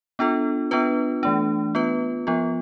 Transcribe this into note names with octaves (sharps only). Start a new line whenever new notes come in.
B3 D4 F4 A4
B3 D4 F4 B4
E3 A3 D4
B3 F4 B4
F3 B3 F4